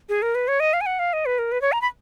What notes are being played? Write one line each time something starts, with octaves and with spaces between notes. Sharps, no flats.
G#4
A#4
B4
C#5
D#5
F5
G#5
F#5
F5
D#5
B4
A#4
B4
C#5
A#5
B5